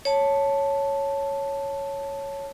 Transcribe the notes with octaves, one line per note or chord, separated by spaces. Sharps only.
C#5 A5